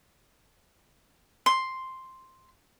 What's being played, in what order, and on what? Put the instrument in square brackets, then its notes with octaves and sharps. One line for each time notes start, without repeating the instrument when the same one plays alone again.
[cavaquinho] C6